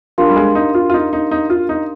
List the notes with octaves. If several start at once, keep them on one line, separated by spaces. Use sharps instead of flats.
F3 D4 G4 A#4 F5 C6
G3
G#3
D#4
F4
F4
D#4
D#4
D#4
F4
D#4